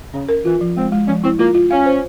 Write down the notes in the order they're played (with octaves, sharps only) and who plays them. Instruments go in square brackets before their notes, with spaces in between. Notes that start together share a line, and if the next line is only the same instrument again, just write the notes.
[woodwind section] C#3 [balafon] C#4
[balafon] A#4
[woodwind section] E3 [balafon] F4
[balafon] F3
[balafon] G#3 [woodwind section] C4
[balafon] G#3
[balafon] F3 [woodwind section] C#4
[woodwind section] C4 [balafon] E4
[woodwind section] A#3 [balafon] F4
[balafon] F4
[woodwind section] C#4 [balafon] F5
[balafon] C5